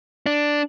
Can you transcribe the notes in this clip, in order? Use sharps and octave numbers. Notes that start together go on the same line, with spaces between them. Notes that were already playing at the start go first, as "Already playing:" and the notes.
D4